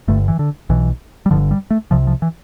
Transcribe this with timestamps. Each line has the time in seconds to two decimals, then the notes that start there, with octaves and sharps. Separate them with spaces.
0.08 G1 G2 D3 A3
0.28 E3
0.39 D3
0.69 B1 B2 E3
1.26 G3
1.31 G1 G2 D3 F3
1.51 G3
1.71 A3
1.91 C2 C3 F3
2.07 F3
2.22 E3